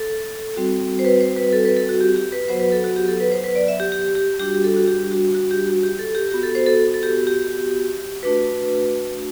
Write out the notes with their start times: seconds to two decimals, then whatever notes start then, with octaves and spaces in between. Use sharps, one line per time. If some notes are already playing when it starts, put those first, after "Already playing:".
Already playing: A4
0.56 G3 C4 F#4
0.99 C5
1.05 B4
1.21 C5
1.36 B4
1.53 A4
1.65 B4
1.77 A4
1.89 F#4
2.01 G4
2.16 G4
2.32 B4
2.49 F#3 B3 F#4 C5
2.60 B4
2.72 A4
2.84 F#4
2.96 G4
3.08 A4
3.20 B4
3.32 C5
3.44 B4
3.56 D5
3.68 E5
3.80 G4
3.92 G4
4.15 G4
4.39 G3 D4 F#4 G4
4.64 A4
4.77 F#4
4.88 G4
5.11 F#4
5.35 F#4
5.51 G4
5.67 F#4
5.83 G4
5.99 A4
6.15 G4
6.31 B3 F#4 G4
6.43 A4
6.55 C5
6.66 A4
6.94 A4
7.03 G4
7.27 G4
8.23 A3 D4 F#4 B4